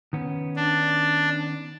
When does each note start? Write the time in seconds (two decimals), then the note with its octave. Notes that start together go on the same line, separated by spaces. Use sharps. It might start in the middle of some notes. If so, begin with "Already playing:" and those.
0.13 D#3 B3 C#4
0.56 D4